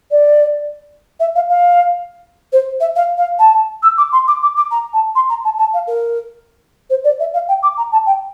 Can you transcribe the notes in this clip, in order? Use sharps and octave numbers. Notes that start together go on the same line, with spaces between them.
D5
E5
F5
F5
C5
E5
F5
F5
A5
E6
D6
C6
D6
D6
D6
A#5
A5
C6
A#5
A5
A5
F5
A#4
C5
D5
E5
F5
G5
D6
A#5
A5
G5